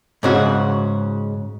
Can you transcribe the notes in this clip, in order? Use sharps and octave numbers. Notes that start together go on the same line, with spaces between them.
G#2 C#3 F#4